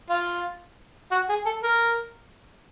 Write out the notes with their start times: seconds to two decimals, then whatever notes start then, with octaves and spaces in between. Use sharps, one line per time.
0.10 F4
1.11 F#4
1.29 G#4
1.46 A4
1.63 A#4